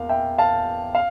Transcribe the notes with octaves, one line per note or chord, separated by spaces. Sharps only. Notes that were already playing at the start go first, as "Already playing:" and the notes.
Already playing: E2 A#3 F5
E5 G5
F5 A5
F5